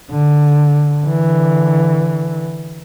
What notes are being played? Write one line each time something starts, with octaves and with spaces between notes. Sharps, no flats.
D3
D3 E3